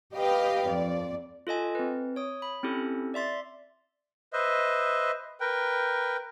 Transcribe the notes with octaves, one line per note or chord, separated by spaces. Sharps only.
G4 B4 D#5 F5 G5
F2 D5
F4 A4 D#5 G#5
C4 B4
C#5 D#6
B5
C4 C#4 E4 G4 A4
D5 E5 C6 A6
B4 C5 D#5 E5
A#4 B4 G5